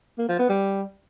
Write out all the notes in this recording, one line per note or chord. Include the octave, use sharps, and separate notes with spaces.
A#3
F3
B3
G3